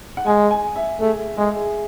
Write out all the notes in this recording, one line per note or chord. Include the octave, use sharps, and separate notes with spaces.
F#5
G#3 G#5
G#5
E5
A3 G#4
G#3 G#4
G#4